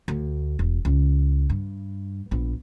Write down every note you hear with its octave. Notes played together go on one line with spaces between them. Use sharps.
D2
E1
C#2
G2
A#1 B3